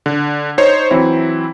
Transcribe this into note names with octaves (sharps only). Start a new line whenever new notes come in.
D3
D#4 C5 C#5
E3 F#3 C4 E4